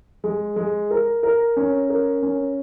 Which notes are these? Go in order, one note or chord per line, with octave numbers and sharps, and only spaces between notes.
G#3
G#3
A#4
A#4
C#4
A#4
C#4